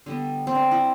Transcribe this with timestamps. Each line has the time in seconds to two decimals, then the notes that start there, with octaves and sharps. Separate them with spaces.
0.06 D3 G3 B3
0.47 C4
0.55 D4
0.71 E4